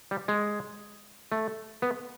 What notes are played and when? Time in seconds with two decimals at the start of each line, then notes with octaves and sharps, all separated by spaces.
0.11 G3
0.28 G#3
1.32 A3
1.82 B3